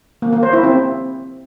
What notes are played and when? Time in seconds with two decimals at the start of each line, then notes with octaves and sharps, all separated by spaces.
0.22 A#3
0.33 A#3
0.43 C5
0.53 E4
0.63 C4